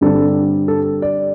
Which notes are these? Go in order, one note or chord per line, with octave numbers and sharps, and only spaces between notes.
G2 D3 G3 C4 A4
A4
D5